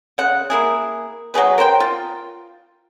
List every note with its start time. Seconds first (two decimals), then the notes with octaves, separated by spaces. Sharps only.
0.18 C#3 F#5
0.50 A#3 E4 G#4
1.34 F#3 F#4 G#4 B4
1.58 A#4 C5 F#5 G5
1.80 F4